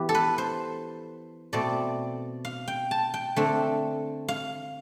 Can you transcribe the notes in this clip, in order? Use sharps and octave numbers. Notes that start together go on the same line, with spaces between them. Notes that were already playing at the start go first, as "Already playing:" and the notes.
Already playing: E3 B3 G4
A4
B4
C5
B2 A3 C4 D5
F5
G5
A5
G5
D3 A3 C4
F5